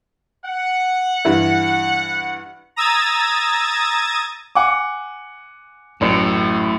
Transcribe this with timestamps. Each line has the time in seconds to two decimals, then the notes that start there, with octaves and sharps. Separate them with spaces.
0.45 F#5
1.25 G2 E3 E5
2.76 A#5 D#6 E6 G#6 A6
4.55 F#5 G#5 D6
6.01 A1 F#2 A2